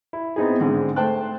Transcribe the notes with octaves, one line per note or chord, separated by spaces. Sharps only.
E4
B3 C4 D#4 E4 G#4
G#2 D3 G#3 C4
A3 C5 G5 A5 F#6